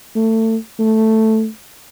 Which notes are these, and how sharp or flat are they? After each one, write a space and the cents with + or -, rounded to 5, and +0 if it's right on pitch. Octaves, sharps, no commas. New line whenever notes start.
A3 +25
A3 +0